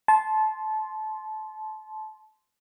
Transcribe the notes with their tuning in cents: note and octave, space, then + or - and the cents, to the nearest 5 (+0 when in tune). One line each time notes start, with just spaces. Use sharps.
A5 -25 C6 +0